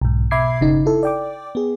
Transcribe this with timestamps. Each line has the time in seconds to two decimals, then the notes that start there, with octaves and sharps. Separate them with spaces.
0.02 B1 G#2
0.31 B2 E5 B5 D6 G#6 C7
0.61 G1 C#3 D#4
0.86 E4 A4
1.03 D5 G5 D6
1.55 B3 G#4